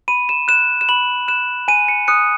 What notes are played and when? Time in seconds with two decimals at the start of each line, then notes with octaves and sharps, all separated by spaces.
0.08 B5 D#7
0.29 E7
0.48 F#6 E7
0.81 E7
0.89 B5 F#7
1.28 F#6 E7
1.68 G#5 D#7
1.88 C#7
2.08 D#6 F#6 C#7